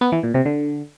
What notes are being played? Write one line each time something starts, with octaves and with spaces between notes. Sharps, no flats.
B3
E3
A#2
C3
D3